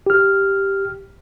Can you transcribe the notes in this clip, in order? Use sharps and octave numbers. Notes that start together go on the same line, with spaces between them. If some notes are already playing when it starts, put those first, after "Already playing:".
G4 F6